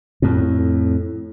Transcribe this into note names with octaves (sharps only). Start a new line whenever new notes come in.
F2 A2